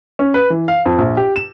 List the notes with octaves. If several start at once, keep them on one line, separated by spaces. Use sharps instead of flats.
C#4
B4
E3
F5
F2
A#1
G4
E7